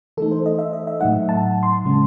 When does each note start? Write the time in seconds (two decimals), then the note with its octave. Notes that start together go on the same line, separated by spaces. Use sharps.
0.17 E3 A3 D#4 A4
0.31 C5
0.46 D#5
0.59 E5
0.73 D#5
0.87 E5
1.00 A2 F#3 A3 D#4 F#5
1.29 A5
1.63 C6
1.84 C#3 G#3 C#4